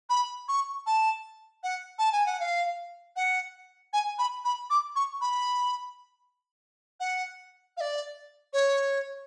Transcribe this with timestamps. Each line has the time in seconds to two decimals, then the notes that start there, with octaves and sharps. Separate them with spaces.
0.10 B5
0.48 C#6
0.86 A5
1.63 F#5
1.98 A5
2.12 G#5
2.26 F#5
2.40 F5
3.16 F#5
3.93 G#5
4.19 B5
4.45 B5
4.70 D6
4.96 C#6
5.21 B5
7.00 F#5
7.77 F5
7.80 D5
8.53 C#5